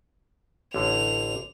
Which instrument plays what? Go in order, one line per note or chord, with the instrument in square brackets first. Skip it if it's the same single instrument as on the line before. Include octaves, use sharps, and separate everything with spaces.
[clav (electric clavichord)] A1 D3 [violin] F7